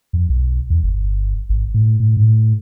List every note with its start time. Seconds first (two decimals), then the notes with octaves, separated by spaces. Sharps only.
0.13 F2
0.29 B1
0.70 E2
0.83 G1
1.49 G#1
1.74 A2
2.00 A2
2.17 A2